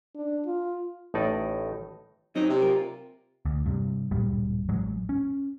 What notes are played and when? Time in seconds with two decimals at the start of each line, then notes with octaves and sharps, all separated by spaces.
0.15 D4
0.46 F4
1.14 A1 A2 D#4 D5
2.35 F#3 C4 D#4
2.49 C3
2.62 F4 A#4
3.45 D2
3.66 G2 C3
4.11 D1 G2 A#2 G3
4.69 A1 F#3 G#3
5.09 C#4